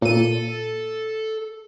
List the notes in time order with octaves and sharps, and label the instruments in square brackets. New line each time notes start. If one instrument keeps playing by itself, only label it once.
[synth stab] A#2 D#7 [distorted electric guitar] A4